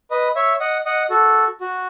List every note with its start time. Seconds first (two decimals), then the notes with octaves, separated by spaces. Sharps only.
0.11 B4 D#5
0.35 C#5 E5
0.60 D#5 F#5
0.85 D#5 F#5
1.10 F#4 A4
1.61 F#4